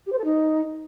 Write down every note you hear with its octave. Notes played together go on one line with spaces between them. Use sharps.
G4
C5
A4
D#4